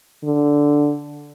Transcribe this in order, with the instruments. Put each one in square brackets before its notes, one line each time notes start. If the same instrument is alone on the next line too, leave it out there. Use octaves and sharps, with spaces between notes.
[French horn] D3